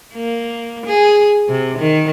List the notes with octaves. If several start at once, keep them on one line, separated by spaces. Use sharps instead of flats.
A#3
G#4
C3
D#3